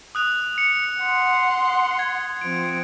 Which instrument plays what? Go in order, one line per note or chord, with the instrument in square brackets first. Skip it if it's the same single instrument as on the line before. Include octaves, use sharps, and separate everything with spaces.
[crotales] D#6 F#6 F7
C#7
[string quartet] F#5 C6
[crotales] G#6
[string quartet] F3 C4 [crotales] D7